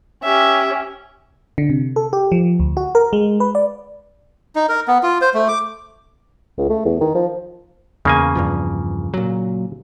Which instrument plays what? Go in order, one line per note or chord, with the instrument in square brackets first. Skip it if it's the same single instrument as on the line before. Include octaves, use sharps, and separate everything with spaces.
[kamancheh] C#4 G4 [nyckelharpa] E5
[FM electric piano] D3
C3
A4
G4
F3
D2
F#4
A#4
G#3
B4
D5
[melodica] D#4
A#4
B3
F4
C5
A3
D6
[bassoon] C#2
A3
E2
D#3
F3
[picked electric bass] E2 [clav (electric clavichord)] C#3 A#3 G#5
[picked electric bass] E2 G2 F3
A#2 F#3